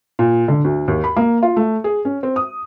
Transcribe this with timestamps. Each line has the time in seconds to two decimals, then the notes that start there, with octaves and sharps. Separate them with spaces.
0.19 A#2
0.48 D3
0.64 D2
0.88 D#2
1.04 B5
1.17 A#3
1.43 F4
1.56 A3
1.84 G#4
2.05 C#4
2.23 C4
2.36 D#6